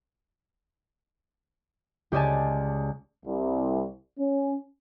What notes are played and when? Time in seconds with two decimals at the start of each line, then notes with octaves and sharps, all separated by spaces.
2.12 C#2 G4 G#4 D5 G#5 A5
3.26 C2
4.19 C#4